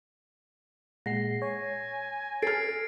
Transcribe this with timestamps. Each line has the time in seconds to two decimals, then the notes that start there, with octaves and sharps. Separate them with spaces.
1.06 A#2 G#3 F#5 A#6 C7
1.42 C#5 G#5
2.42 A4 F6 A6 C7 D7